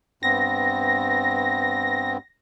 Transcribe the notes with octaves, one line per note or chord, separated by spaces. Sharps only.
G2 B3 C4 A#6